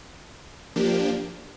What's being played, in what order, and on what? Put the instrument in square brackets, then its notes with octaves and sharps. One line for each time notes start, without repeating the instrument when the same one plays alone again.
[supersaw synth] F3 A#3 D4 G4